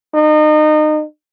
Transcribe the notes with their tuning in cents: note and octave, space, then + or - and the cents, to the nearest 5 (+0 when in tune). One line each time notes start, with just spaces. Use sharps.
D#4 -30